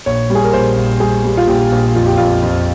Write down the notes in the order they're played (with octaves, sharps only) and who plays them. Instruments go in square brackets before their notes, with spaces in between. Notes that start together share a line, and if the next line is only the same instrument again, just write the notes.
[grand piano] A#1 C#5
G3
G#4
A#4
A#1 C5
A#1
G3 G#4
G3
F4
A#1 G4
A#1
F2 F4
G4
F2 F4
F2